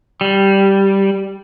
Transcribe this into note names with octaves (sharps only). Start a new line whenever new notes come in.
G3